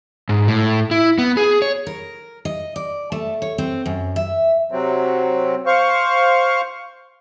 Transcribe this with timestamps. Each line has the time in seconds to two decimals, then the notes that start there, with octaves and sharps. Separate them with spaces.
0.29 G#2
0.48 A2
0.91 E4
1.18 B3
1.37 G#4
1.62 C#5
1.87 A#4
2.45 D#5
2.76 D5
3.12 A3
3.42 C#5
3.58 C4
3.86 F#2
4.16 E5
4.72 C3 F#3 C4
5.66 C5 F5 C#6